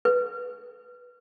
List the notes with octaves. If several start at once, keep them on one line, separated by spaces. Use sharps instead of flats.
B4